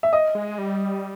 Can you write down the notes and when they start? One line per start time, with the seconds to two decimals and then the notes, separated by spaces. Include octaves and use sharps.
0.03 E5
0.13 D#5
0.35 G#3
0.58 G3